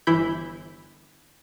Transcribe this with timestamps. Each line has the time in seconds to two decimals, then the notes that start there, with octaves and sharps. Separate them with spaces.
0.07 G1 E3 E4 B5 G6